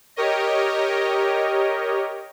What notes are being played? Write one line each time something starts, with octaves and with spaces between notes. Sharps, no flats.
G4 A#4 C#5 D#5